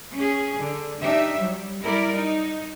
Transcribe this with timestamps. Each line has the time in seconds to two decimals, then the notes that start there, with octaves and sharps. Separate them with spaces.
0.14 C#4 G#4
0.58 D3
1.01 D4 D#4 G4 E5
1.35 F#3 G3
1.80 G3 E4 A#4 D5
2.10 D#4